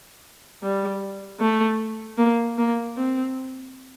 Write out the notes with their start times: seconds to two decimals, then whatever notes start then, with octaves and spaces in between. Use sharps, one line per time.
0.63 G3
1.40 A3
2.18 A#3
2.58 A#3
2.97 C4